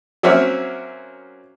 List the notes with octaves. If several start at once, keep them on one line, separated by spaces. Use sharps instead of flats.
F#3 A#3 C4 C#4 E5 F6